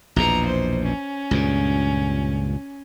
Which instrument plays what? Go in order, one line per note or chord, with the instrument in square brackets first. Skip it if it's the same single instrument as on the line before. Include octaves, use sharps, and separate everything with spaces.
[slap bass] A#1 E2 B2 [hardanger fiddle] A#5
[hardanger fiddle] C5
C#4
[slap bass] C#2 G2 A#2